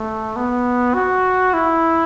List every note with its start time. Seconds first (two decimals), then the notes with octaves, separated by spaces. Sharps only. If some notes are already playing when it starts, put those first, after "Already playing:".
Already playing: A3
0.36 B3
0.95 F#4
1.54 E4